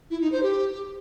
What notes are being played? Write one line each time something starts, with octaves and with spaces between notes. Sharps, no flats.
E4
D#4
C5
G4